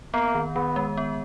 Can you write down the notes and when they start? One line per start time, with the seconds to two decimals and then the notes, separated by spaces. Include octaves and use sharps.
0.14 A#3 B3
0.35 D#3
0.55 D#3 B3
0.76 G#3
0.97 B3